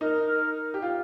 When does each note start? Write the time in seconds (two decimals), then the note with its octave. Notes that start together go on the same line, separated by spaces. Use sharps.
0.01 D#4 A#4
0.74 G4
0.82 F4